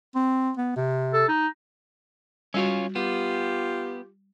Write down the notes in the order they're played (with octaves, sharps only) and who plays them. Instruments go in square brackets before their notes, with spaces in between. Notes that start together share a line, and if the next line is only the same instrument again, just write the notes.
[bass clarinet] C4
B3
C3
[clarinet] A4
D#4
[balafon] G3 F#4 [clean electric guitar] C#4 F4 C#5
[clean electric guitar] B3 [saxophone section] F4 G4